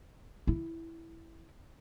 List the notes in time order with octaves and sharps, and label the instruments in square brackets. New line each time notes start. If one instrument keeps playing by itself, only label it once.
[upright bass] E4